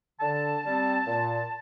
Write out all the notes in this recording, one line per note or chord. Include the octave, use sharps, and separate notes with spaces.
D3 A5
G3 C4
A#2